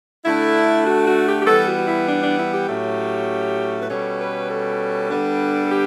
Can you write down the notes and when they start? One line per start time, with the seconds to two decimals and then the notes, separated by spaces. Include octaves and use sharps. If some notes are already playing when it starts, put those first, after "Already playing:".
0.24 D3 A3 D4 E4
0.85 F#4
1.05 F#4
1.26 G4
1.40 G4
1.46 E3 G3 B3 A4
1.66 F#4
1.77 F#4
1.86 E4
2.06 D4
2.21 D4
2.37 E4
2.52 G4
2.67 A2 F#3 A3 C#4
3.82 B4
3.88 B2 G3 C#4 A4
4.18 B4
4.49 A4
5.09 D3 G3 B3 D4
5.64 A4
5.69 G4